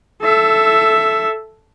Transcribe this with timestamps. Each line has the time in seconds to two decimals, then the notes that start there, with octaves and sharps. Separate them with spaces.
0.22 A4 E5